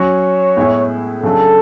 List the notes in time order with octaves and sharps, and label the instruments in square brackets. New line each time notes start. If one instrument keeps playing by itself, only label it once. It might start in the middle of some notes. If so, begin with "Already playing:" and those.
Already playing: [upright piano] F#3 C#4 F#4 [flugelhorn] C#5
[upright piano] A2 G#3 B3 E4 G#4
[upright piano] C#3 F#3 A3 D4 G#4 [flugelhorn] A4